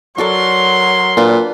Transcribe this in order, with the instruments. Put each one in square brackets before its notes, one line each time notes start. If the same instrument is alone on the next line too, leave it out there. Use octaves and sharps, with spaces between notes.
[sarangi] F#3 [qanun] F#4 A4 D5 [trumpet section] A#4 C6
[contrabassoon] A#2 [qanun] D4 F4 B4